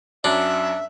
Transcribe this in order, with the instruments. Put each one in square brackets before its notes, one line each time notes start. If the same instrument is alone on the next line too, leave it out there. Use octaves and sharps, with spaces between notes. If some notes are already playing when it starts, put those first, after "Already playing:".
[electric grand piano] F#2 F#3 C#4 [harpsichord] D4 [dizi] E5